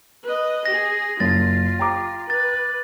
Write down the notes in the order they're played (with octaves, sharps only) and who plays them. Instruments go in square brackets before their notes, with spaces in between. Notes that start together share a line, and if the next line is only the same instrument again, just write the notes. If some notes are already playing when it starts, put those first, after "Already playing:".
[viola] B4 D#5
[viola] G#4 [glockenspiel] A#6
[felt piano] F#1 [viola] F4 [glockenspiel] A6
[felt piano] G5 A#5 D6
[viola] B4 [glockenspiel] A6